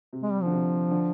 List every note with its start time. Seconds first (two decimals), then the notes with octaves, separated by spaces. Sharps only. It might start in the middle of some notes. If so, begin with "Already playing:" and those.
0.13 C3
0.23 G#3
0.31 G3
0.42 D3 F3
0.52 C3
0.91 D3